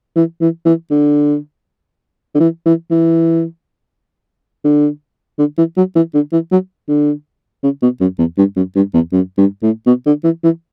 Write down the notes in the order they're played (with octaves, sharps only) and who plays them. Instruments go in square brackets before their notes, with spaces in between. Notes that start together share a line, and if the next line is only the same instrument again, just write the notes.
[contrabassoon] E3
E3
E3
D3
D3
E3
E3
E3
D3
D3
E3
F#3
E3
D3
E3
F#3
D3
C#3
B2
F#2
E2
G2
F#2
G2
E2
F#2
G2
A2
B2
D3
E3
E3